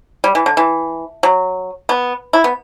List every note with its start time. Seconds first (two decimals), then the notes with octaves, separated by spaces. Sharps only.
0.24 G3
0.35 E3
0.46 D3
0.57 E3
1.23 F#3
1.89 B3
2.33 E4
2.44 B3